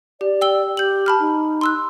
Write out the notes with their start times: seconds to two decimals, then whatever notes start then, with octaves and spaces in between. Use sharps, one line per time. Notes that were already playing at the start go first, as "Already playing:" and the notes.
0.21 G4 D5
0.41 G5 E6 G7
0.77 G4 G6 F#7
1.06 A5 B5 F6
1.19 D#4
1.61 C6 E6 F#6